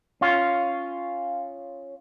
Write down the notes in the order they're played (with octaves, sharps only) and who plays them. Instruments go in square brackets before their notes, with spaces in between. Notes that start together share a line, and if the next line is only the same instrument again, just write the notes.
[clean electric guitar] C#4 F4